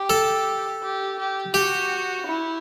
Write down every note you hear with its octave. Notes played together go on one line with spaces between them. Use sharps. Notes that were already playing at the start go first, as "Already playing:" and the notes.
Already playing: G4
A4
G4
G4
F#4 G4
E4